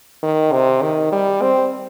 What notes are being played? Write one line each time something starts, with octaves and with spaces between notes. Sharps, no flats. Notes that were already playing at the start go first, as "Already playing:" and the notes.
D#3
C3
D#3
G3
C4